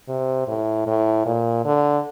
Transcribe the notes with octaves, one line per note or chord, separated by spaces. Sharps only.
C3
A2
A2
A#2
D3